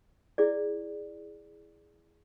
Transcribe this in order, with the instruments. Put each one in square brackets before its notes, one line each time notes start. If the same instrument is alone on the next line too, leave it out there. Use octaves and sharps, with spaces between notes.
[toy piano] E4 G#4 D5